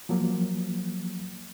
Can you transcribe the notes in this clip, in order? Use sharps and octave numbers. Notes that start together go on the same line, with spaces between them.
F3 F#3 A#3